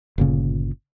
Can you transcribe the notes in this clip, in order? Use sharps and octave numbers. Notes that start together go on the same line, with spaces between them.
G1 A#2 C#3